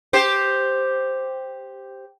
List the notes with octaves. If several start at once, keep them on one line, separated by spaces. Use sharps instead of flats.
G4 C5